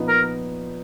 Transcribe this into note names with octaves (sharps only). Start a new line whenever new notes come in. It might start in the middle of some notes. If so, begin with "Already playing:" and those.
Already playing: A#2 F3 B3 D#4
A#4